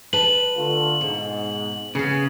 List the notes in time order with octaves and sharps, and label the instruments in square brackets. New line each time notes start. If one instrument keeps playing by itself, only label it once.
[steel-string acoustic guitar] B4 A5 [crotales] F#7
[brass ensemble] D3 A3 F4
[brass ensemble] G#2 [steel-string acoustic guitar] B2
[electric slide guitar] C#3 [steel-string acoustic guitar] B3 G#4